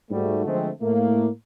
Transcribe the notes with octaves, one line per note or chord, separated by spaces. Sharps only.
G#2 G3 A3 F#4
D3 F3 G#3 A3 C4
A2 A3 A#3